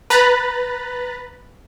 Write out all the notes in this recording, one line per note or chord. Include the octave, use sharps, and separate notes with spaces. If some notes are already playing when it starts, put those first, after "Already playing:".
B4 A#5 B5 F#6 A6